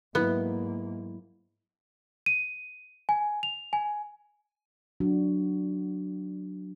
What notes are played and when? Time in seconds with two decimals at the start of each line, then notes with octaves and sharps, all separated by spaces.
0.15 G#2 F#3 A#3 B3 E4
2.26 D#7
3.09 G#5
3.43 F7
3.73 G#5
5.00 F#3 D4 F#4